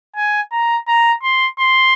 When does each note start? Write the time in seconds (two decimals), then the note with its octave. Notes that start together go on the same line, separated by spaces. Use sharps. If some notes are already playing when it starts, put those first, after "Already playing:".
0.16 G#5
0.52 A#5
0.87 A#5
1.22 C6
1.59 C6